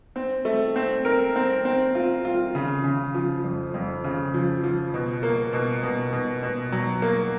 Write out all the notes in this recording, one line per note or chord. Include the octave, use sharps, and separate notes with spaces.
C4
A3
C4
A#4
C4
C4
F4
F4
C#3
C#3
F3
F2
F2
C#3
F3
F3
B2
A#3
B2
B2
B2
B2
F#3
A#3